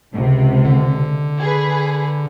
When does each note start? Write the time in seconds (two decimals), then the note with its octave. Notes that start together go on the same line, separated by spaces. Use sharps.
0.14 C#2 C3
0.65 D3
1.39 G#4 B4